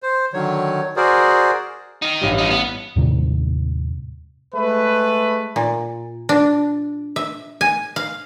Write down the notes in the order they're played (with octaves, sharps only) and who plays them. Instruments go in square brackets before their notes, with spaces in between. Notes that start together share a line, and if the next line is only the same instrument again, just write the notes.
[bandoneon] C5
D3 D#3 F#3 C#5
F#4 G#4 A#4 C5 D5
[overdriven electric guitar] D#3 D#4
[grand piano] A1 G2
[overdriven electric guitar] F3 D#4
B3
[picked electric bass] D#2 A2 C3 G3
[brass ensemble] G#3 A3 B4
[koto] A#2
D4
E5
G#5
F5